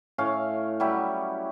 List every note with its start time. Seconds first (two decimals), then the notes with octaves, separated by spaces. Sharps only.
0.18 A2 C#4 F5
0.80 F#3 G3 E4 G4